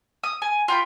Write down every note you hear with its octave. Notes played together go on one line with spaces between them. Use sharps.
D#6
G#5
F4 G5 B5